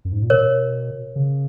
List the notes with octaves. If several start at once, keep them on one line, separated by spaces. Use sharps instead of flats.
F#2
G#2
A#2
B2 A#4 C#5
C#3